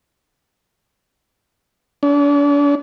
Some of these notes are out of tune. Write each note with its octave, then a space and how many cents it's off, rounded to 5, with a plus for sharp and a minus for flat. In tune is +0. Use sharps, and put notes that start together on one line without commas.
D4 -40